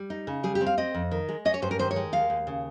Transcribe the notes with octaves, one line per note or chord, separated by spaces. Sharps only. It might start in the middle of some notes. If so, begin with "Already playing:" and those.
Already playing: G3
D#4
C#3
G3 G#4
G4
C4
F5
C4 D#5
F2
D#3
G#3
C#4 D#5
C#5
G2 C5
A#4
D#3 C5
C#5
G#3
D#2 F5
D#2
C#3